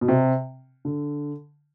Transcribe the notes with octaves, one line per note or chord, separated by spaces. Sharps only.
B2
C3
D3